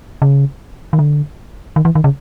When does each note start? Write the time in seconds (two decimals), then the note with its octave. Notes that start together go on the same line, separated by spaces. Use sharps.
0.22 C#3
0.93 D#3
0.99 D3
1.76 D#3
1.85 E3
1.95 D#3
2.04 C#3